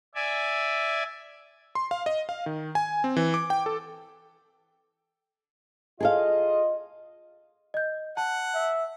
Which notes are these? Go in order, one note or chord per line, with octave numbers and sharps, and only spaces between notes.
D5 E5 G#5
C6
F5
D#5
F5
D#3
G#5
C4
E3
D6
G5
A4
F4 G#4 A4 D#5 F5
D#5 G6
F#5 A5
E5